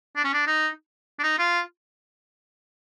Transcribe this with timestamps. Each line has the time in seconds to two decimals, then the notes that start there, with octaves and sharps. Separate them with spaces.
0.16 D4
0.24 C#4
0.33 D4
0.47 D#4
1.19 D4
1.23 D#4
1.39 F4